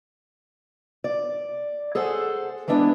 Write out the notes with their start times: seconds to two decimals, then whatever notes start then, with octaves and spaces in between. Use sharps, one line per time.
1.04 D5
1.95 G#4 A4 C5 F#5 G#5
2.68 E3 G#3 B3 D4 E4